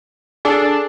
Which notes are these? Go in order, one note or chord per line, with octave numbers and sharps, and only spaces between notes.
D4 G#4 A4